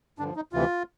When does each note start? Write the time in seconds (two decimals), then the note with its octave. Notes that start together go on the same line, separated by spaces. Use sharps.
0.19 G2 D3 F3 D4
0.36 D#4
0.53 D2 C3 E3 F4